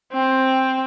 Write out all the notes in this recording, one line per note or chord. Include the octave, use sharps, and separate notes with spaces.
C4